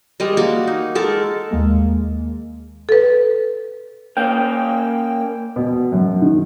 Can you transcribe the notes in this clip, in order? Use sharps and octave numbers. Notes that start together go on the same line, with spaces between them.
G3 G#3 A#4 D#5
A#3 F#4
D#4
G#3 A4 A#4
D#2 G#3 A#3
A4 B4
A#3 C#4 G5
B2
F#2
D#3